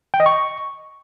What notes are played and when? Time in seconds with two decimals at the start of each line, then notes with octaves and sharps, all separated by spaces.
0.14 G5
0.20 D#5
0.26 C#6